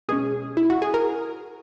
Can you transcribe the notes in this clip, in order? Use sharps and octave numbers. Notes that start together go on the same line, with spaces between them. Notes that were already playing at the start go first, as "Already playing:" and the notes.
B2 G#3 C#4 G#4
E4
F#4
G#4
A#4